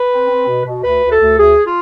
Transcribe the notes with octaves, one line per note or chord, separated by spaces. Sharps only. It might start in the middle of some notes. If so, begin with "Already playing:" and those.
Already playing: B4
C4
C4
B2
B2
D2 B4
D2
A4
D2
D2 G#4
F4